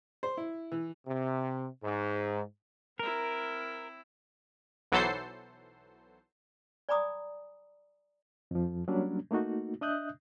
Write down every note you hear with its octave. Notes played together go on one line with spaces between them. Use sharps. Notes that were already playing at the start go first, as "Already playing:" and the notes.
C5
E4
E3
C3
G#2
C4 E4 A#4
B1 E3 F#3 A4 C5 C7
D5 G#5 A#5 B5 D6 D#6
F2 F3
F#3 G3 A#3 C#4 D4
A3 A#3 D#4 F#4
D4 D#5 E5 D#6 F#6 G6